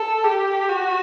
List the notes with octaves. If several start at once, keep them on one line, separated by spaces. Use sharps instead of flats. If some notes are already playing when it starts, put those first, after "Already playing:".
Already playing: A4
G4
F#4